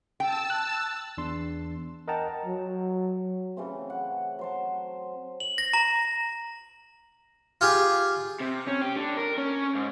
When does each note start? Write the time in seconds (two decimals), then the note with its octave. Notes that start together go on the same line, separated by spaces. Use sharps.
0.20 G5 A5 E6
0.50 F#6
1.18 E2 D4 C6
2.08 A#4 D#5 F#5 G5 A5 A#5
2.45 F#3
3.57 C#3 E3 A3 C4
3.90 F#5
4.39 F#3 C5 A5
5.40 F#7
5.58 A#6
5.73 A#5
7.61 F4 G4 G#4
8.40 C3
8.67 C#4
8.82 G4
8.97 D3
9.17 A#4
9.38 C#4
9.75 G#2